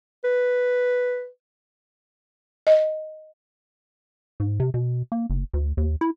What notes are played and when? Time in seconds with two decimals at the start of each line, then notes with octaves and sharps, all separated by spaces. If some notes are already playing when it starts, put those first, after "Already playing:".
0.24 B4
2.67 D#5
4.40 G#2
4.60 C3
4.74 B2
5.12 A#3
5.30 F#1
5.53 D2
5.77 D#2
6.01 E4